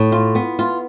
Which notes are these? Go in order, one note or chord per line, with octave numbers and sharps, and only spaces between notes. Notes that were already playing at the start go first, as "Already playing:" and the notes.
Already playing: A2
F4
B3
F4